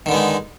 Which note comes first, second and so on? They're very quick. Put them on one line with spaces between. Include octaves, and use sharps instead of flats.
D#3 D3 B3 G#3 D#4